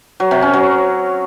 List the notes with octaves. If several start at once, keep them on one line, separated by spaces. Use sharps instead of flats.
F#3
C3
C#4
F#3